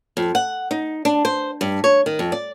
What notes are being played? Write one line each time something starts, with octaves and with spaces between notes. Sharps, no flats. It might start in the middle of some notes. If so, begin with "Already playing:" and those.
F2
F#5
D#4
D4
C5
G2
C#5
D#3
F2
D5